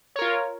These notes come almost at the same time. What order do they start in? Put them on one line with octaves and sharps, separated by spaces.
C#5 A#4 F4